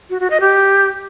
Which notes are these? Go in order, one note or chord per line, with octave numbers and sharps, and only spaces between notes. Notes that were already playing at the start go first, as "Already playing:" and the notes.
F#4
F#4
D#5
G4